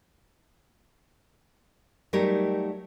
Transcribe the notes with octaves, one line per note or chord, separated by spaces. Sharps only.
F#3 G3 A3 D#4 G4 A#4